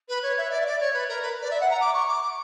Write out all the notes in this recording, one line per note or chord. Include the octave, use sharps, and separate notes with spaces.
B4
C#5
E5
D5
E5
D5
C#5
B4
A#4
B4
D5
E5
F#5
A#5
D6
C#6
D6